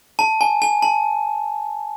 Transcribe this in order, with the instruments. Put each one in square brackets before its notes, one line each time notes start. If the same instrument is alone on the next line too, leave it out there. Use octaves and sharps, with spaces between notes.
[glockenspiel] A5
G#5
G#5
A5